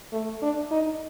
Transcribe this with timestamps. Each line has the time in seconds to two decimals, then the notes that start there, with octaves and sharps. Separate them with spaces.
0.12 A3
0.42 D4
0.71 D#4